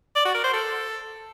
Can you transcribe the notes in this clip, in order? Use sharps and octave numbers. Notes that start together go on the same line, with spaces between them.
D5
F#4
A#4
C5
A4